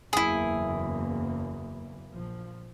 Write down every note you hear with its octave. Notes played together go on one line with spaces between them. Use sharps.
F#1 E2 A#3 E4 G#4
A#1 F3